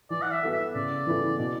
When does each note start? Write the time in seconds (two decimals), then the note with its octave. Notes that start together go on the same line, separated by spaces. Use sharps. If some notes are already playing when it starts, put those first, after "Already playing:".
0.10 E3 D5
0.22 F#5
0.31 E5
0.43 B3 F#4 A4
0.53 E5
0.74 C#3 D5
1.07 E3 B3 E4 A4
1.38 B2